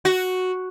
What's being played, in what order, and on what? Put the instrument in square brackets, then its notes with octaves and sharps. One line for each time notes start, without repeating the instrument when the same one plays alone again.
[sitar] F#4